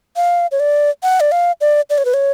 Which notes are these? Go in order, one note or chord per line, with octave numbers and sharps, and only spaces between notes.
F5
C#5
D5
F#5
D5
F5
D5
D5
C#5
B4
C#5